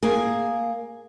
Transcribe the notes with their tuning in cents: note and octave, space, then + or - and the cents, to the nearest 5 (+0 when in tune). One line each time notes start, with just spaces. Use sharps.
A#3 +0 G#4 +0